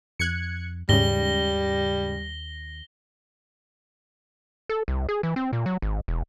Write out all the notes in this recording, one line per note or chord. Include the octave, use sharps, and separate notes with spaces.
F2 F#6 G#6 C#7
D#2 G#2 C#3 G3 A#6 G7
A4
C2
G#4
E3
C4
A#2
F#3
G#1
E1